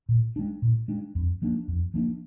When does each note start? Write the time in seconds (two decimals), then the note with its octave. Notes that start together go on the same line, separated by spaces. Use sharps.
0.09 A#2
0.36 G#3 D4
0.62 A#2
0.88 G#3 D4
1.15 F2
1.42 F3 A#3 D4
1.68 F2
1.94 F3 A#3 D4